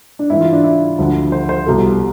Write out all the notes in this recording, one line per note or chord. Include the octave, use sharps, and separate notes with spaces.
D4
G#2 E3 E4
F4
D4
E4
D2 D3 F3
C5
C5
C2 B2 A4